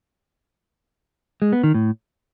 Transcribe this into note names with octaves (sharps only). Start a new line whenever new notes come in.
G#3
B3
D#3
A2